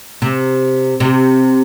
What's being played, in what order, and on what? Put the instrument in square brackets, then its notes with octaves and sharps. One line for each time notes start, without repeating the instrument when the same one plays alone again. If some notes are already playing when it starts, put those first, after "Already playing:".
[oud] C3
C3